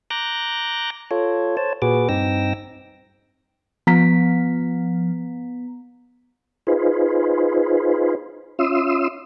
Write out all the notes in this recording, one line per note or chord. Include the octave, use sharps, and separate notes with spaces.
A#5 D6 F#6 G6 A#6
F4 A4 C#5
C5 C#5 A5
A#2 F#4 G#4 B4 D6
G2 C4 D#4 G5 E6 A#6
F3 B3 A#5 B6
D#4 F4 G#4 B4 C5
C#4 F4 E5 C6 D#6 E6